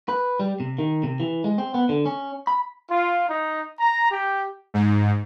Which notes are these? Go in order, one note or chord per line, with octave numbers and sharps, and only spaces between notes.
B4
G3
C3
D#3
C3
E3
G#3
C4
B3
D3
C#4
B5
F4
D#4
A#5
G4
G#2